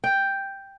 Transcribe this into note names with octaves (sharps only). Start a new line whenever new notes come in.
G5